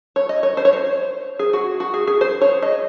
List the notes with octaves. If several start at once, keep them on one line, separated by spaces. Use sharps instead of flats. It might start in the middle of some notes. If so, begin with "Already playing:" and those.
C#5
D#5
C#5
C5
C#5
C5
G#4
F#4
F#4
G#4
G#4
C5
C#5
D#5